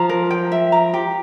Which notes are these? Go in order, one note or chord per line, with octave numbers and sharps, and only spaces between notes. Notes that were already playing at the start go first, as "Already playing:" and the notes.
Already playing: F3 A#5
A#4
G5
E5
A#5
G4